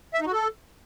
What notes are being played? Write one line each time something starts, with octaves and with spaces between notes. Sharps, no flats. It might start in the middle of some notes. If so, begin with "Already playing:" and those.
E5
D#4
F#4
A4